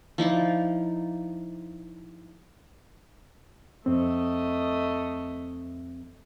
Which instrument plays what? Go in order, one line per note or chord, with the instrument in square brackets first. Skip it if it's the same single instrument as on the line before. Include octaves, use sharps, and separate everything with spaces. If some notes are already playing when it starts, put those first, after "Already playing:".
[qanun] F3 D#4 E4 D5
[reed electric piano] F2 C4 [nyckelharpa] A3 D#5